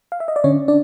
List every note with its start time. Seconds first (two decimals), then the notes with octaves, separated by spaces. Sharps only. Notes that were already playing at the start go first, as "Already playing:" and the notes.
0.12 F5
0.20 E5
0.28 D#5
0.36 D5
0.44 D3 C#4 C#5
0.68 D4 D5